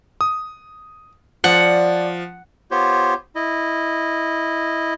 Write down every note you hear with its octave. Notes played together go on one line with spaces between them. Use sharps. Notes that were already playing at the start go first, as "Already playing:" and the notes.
D#6
F3 D5 F#5
B3 F4 G4 C5 C#5
E4 D#5